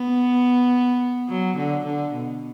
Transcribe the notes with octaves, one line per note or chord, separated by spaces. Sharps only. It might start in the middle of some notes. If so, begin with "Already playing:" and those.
Already playing: B3
F#3
D3
D3
B2